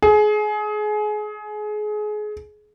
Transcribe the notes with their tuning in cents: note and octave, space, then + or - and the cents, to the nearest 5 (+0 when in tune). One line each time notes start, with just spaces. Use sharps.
G#4 +25